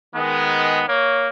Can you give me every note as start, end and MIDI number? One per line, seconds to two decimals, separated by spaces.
0.15 0.82 51
0.15 0.82 56
0.15 0.86 59
0.88 1.28 58
0.88 1.29 73